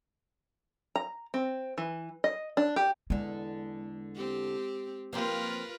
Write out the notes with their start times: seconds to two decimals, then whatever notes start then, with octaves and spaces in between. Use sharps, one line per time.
0.96 A#5
1.34 C4
1.78 E3
2.24 D#5
2.57 D4
2.76 G4
3.10 E2 D3 G#3
4.15 C4 G4
5.13 F3 A#3 C4 F4 A#4 B4